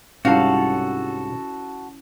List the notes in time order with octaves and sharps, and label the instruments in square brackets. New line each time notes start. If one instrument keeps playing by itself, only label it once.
[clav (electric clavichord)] C2 G#2 G3 [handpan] C#4 E4 [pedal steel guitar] F#4 A4 [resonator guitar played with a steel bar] F5